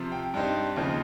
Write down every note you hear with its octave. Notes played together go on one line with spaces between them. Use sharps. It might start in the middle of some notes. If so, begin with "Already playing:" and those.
Already playing: C3 F3
G5
G2 G3 C4 D#4
D#2 C#3 F3 C4 D#4